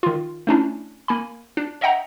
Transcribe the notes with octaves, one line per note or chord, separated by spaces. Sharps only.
D#3 F4
A3 C#4 D4 E4
A#3 G#5 B5
D4
C#5 D#5 E5 F#5 G5 A#5